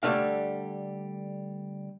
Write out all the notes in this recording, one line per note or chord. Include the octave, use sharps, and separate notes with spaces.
D3 G3 A3 D4 F5